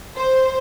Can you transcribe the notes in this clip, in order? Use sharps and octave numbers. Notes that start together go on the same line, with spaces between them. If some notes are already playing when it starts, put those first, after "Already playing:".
C5